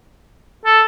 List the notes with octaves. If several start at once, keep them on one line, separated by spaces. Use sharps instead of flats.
A4